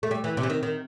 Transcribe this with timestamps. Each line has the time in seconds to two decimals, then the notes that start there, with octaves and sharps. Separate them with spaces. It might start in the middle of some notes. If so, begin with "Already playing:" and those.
0.03 A3
0.11 G3
0.24 E3
0.37 C3
0.43 E3
0.50 D#3
0.63 D#3